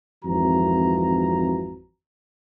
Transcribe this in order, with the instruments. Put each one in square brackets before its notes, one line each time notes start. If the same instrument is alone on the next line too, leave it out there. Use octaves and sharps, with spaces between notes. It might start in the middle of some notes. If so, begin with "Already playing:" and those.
[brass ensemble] G#1 F2 E3 F3 F#4 A#5